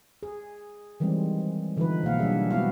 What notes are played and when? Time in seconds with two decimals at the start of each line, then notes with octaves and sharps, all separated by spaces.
0.23 G#4
1.00 D#3 E3 G3 G#3 C4
1.77 D3 E3 F3 D#4 E4 B4
2.03 B2 A#3 F5 F#5
2.19 F#3 G3 D4 G#4 E5
2.51 G#3 B3 E4 F#4 F5